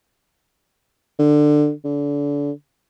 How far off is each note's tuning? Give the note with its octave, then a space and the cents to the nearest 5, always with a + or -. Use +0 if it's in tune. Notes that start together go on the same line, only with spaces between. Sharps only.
D3 +15
D3 -30